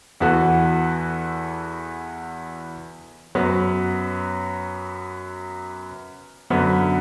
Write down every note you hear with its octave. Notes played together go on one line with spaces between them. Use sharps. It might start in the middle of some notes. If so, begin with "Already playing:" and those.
E2 E3 B3 F#4 A4
F#2 F#3 B3
F#2 D3 F#3 B3